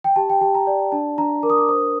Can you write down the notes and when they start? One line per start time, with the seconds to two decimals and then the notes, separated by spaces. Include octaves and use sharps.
0.04 G5
0.16 G4 A5
0.30 G5
0.41 G4 A5
0.55 A#5
0.67 D5
0.92 D4 A5
1.18 D4 A#5
1.43 A#4 D6
1.50 D#6
1.58 D6
1.69 C5 D#6